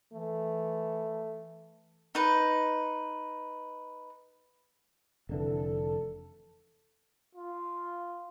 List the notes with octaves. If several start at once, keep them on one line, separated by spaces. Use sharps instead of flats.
E3 A3
D#4 B4
F1 D3 E3 A4
F4